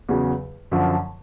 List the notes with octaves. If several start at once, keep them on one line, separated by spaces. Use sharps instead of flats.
E2 C#3 F#3
F#2 D3 F3